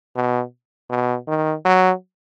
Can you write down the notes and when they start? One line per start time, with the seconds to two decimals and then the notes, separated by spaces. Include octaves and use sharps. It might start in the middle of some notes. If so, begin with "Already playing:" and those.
0.16 B2
0.90 B2
1.28 D#3
1.65 F#3